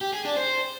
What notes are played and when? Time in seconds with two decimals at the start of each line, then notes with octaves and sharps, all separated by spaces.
0.01 G4
0.13 G#4
0.25 D4
0.37 C5